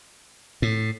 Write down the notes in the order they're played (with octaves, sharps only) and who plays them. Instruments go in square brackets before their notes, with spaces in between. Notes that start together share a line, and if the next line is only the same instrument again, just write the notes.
[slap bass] A2